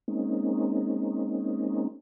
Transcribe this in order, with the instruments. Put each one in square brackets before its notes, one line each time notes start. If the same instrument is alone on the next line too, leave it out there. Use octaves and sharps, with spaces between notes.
[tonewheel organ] G#3 A#3 C4 C#4 D#4